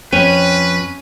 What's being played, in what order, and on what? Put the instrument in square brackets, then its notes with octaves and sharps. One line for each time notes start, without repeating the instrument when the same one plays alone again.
[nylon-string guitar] F2 G5 [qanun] C#4 [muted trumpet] B4 [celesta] D#7